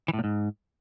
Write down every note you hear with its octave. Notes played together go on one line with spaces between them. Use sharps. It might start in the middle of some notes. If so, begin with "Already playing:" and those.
E3
A2
A#2
G#2